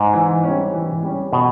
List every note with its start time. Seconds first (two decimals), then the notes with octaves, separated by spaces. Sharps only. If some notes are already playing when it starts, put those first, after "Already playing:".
Already playing: G#2
0.13 E3
0.44 G3 C#4
0.74 E3
1.03 G3 C#4
1.33 B2 E3